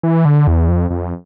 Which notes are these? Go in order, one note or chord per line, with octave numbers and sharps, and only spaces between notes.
E3
D3
E2
F2
F2